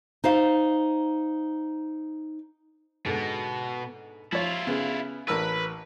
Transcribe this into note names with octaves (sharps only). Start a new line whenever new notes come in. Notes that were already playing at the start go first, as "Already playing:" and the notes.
D#4 C5 F5
G#2 B2 D3
F3 E4 F4 C#5
C#3 B3
A1 A#4 B4 E6